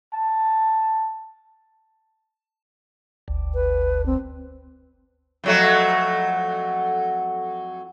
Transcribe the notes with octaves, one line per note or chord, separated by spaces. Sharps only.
A5
G1 D2
B4
C4
F2 F#3 A3